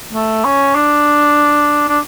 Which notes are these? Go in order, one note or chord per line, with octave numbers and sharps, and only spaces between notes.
A3
C#4
D4
D4